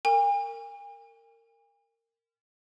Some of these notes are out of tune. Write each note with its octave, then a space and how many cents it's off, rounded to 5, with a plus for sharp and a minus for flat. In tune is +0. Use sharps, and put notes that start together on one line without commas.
A#4 -25 G#5 -45